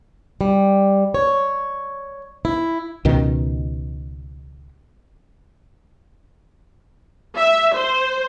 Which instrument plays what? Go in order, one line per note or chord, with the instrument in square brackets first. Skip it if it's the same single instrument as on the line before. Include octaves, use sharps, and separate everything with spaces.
[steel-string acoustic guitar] G3
C#5
E4
[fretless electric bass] C#2 B2 D#3
[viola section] E5
C5